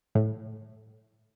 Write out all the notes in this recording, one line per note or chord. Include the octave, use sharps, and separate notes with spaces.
A2